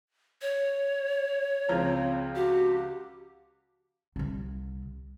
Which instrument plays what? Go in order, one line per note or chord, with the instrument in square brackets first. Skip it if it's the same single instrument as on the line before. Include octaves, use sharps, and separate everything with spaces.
[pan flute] C#5
[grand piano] C#2 F3 A#5 [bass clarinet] C4
[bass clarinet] F#4 [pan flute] G4
[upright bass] C2 C3